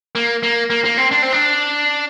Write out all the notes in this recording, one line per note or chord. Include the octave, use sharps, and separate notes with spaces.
A#3
A#3
A#3
A#3
C4
D4
C4
D4